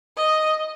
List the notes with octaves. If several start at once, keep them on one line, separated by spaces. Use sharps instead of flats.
D#5